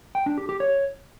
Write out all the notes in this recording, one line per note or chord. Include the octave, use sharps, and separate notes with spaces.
G5
D4
G4
G4
C#5